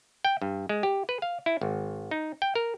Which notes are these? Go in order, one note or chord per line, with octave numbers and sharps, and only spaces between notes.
G5
G2
G#3
G4
B4
F5
E4
G#1
D#4
G5
A#4